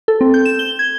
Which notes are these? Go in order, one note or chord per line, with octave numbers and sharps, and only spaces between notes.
A4
C4
G6
E7
G7
G#6